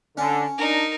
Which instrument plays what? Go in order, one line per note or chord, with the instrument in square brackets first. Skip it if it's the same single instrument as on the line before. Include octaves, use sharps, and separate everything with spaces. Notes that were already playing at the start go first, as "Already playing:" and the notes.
[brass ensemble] D3 [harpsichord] C#4
[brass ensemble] D4 [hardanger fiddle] D#4 A#4